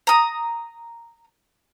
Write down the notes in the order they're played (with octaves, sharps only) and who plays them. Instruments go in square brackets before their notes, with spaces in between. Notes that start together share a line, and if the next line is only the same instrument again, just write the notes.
[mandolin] A#5 D#6